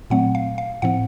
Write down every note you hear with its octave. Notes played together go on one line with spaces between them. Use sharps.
A#2 F#3 A3 C4 F#5
F5
F5
A2 F3 C4 F#5